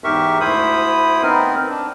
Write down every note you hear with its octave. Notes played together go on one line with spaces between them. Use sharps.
E2 G#2 G4 A#4 E5 C#6
D2 E4 C5 B5 D#6
B3 C4 D#4 A#4
D4